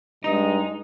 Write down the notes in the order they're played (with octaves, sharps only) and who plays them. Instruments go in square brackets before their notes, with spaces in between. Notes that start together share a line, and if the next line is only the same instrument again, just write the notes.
[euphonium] G2 [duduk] G#3 [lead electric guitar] D#4 [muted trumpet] D#5